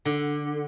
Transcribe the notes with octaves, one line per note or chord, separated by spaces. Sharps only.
D3